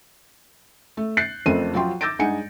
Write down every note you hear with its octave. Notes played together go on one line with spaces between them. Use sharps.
A3
F#6 G6 A6 C7 C#7
F#1 F2 A3 C4 A#4 D#7
F3 F#3 F4 G5 C6
D6 E6 G6 A6 A#6 D7
G2 G#3 D#4 F#5 G#5 C#7